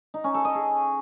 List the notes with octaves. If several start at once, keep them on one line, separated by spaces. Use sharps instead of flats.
D#4
C#4
A4
D#5
G#4